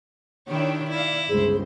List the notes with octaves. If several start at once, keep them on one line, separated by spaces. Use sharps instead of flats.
D#3 D4 E4 G4 C#5
E4 D5 F5
G1 C#2 G#4 C5